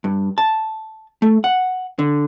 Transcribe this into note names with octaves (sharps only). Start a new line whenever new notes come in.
G2
A5
A3
F#5
D3